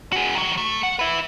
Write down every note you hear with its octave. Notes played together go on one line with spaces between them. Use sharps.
F#4 G#4
D#3 F#3
A3
F#5
B4 E5